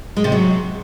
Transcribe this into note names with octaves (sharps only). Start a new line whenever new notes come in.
G#3
C3
F#3